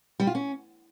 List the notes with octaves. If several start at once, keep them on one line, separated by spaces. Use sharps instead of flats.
G3
F4
C#4